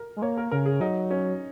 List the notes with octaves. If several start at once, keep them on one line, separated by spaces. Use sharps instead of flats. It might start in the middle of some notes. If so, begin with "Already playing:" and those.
Already playing: A#4
G#3
A#3 C#5
A#4
C#3 A#4
G#4
F#3 D#4
C#4